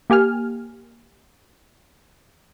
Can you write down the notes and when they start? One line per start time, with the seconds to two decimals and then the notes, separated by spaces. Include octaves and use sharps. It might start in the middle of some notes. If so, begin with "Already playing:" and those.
0.10 A#3 G4 G#5 F6